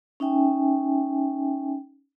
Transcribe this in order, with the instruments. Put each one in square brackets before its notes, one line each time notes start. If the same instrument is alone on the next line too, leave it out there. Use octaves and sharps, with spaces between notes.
[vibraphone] C#4 D#4 E5 G5 G#5